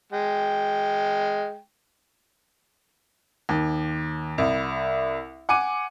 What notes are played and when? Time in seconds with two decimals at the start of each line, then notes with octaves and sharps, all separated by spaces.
0.13 G#3 G5
3.49 D#2
4.38 C2
5.49 F#5 G#5 D6 D#7